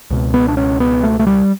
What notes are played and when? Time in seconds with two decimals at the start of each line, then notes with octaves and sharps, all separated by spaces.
0.10 C#2 B2
0.34 B3
0.48 D4
0.57 C#4
0.80 B3
1.03 A3
1.19 A3
1.27 G3